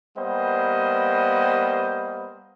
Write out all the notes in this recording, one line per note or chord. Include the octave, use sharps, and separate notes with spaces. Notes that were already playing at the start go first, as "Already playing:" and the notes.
G3 A#3 B3 C5 D#5